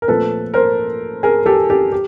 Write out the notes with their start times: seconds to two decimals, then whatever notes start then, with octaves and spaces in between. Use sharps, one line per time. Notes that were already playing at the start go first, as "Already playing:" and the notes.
0.02 A#4
0.08 A#2 F3 A3 C4 A4 B4
0.54 A#4 C5
1.23 G#4 A#4
1.46 G4 A4
1.70 G4 A4
1.92 G4